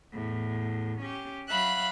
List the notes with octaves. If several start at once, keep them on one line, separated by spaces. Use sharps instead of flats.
E2 A2
C#4 G4
F#3 E5 F5 B5 F#6